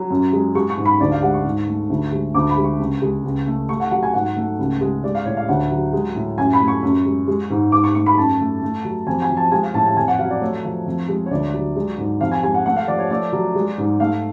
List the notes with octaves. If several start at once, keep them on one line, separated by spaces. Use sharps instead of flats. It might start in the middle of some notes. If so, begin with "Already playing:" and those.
Already playing: F#3
F#2
G#3
G#3 C#6
C#6
G#2
B5
D2 D5
F5
G#3 F#5
C#6
G#2
A3
D2
G#3
D2 D6
B5
G#3
C#6
C#2
G#3
C#2
A3
A3 C#6
F#5
F#3 F#5
G#5
G#2 F#5
A3
C#2
G#3
G#3 D5
F5
A2 C#5
F5
D2 F#5
F#3
G#3
A2
F#2 G#5
B5
A3
C#6
F#2
G#3
G#3
G#2
G#2 D6
C#6
A3 C#6
B5
F#2 A5
A3
A3
F#3
F2 G#5
G#5
F3
A5
G#3 G#5
F5
A2 A5
A5
F2 G#5
F#5
F#3 F5
D5
A3 C#5
F3
F2
G#3
C#5
D2 D5
F#3
G#3
G#2
F2 F5
G#5
G#3 G#5
F#5
A3 F#5
F5
F3 D5
C#5
A3 D5
F#3
G#3
G#2
A3 F5